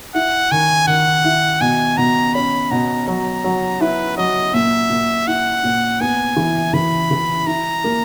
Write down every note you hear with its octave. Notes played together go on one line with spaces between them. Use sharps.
E4 F#5
D#3 G#5
D#3 F#5
E4
B2 G#5
B2 A#5
C#4 B5
B2 A#5
F#3 A#5
F#3
E4 B4
F#3 D#5
A#2 E5
A#2
E4 F#5
A#2
B3 G#5
E3
E3 B5
E3
E4 A#5
A#3